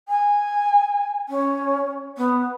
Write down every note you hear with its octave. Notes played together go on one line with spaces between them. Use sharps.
G#5
C#4
B3